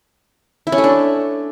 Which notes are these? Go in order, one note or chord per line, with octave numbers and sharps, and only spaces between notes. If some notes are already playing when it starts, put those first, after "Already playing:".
E4
C#4
A3
D4